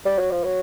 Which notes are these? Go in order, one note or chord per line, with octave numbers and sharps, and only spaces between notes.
G3
F#3
F3
F#3